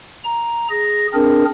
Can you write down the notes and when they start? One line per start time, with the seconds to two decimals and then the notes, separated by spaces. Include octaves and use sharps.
0.24 A#5
0.70 G#4 A#6
1.14 C4 D4 G#4 A#4